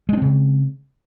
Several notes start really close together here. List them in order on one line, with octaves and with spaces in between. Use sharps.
G#3 D4 C4 C#3